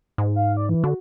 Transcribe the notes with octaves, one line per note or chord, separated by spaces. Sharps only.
G#2
F5
D5
E3
D3 F#4